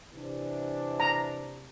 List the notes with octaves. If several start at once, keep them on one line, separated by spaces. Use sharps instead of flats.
C3 E3 D4
A#5